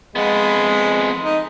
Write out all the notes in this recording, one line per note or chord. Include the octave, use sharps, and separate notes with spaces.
F2 G#3 B3
D#4